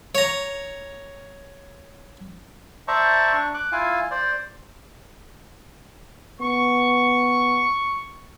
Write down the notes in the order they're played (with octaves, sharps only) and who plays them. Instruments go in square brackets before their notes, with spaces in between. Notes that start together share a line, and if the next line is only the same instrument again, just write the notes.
[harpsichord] C#5 A#5
[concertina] C5 D5 E5 A5 A#5 C#6
D4 C#6
D6 F#6
E4 F4 F5 G#5
C5 D5
[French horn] B3 [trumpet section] C#6